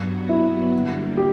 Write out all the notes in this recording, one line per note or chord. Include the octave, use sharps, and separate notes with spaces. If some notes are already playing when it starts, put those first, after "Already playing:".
Already playing: G2 F#3 B3 F#4
E4
D3 G3 A#3
G4